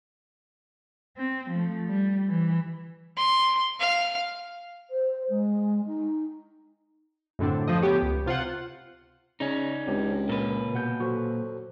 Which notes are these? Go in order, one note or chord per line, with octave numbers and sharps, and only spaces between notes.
C4
F3 A3
G3
E3
C6
F5
C5
G#3
D#4
F#2 A2 D3 C4 D4
F3 A3 D#5
B3 G4 C#5
C#2
C3 F4 C5 F#5
C#3 C#4 D#4 D5
C#2 C4 D4 G4
A#2 A#4 B4
B2 F#5 G6
F#3 F#4 A4 C5